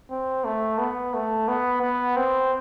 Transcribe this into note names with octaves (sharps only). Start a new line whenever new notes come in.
C4
A3
B3
A3
B3
B3
C4